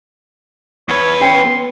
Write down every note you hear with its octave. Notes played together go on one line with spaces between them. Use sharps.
E2 B4 C#5
C#4 G5 C6 C#7
B3